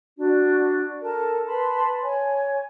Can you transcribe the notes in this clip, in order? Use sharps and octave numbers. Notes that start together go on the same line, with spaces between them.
D4 F#4
A4 A#4 A5
B4 A5 B5 C6
C#5 G#5